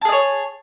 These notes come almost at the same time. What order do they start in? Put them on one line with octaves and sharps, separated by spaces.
A5 G#4 D#5 C#5